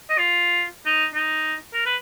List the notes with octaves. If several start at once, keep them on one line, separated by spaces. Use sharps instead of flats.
D#5
F4
D#4
D#4
A#4
B4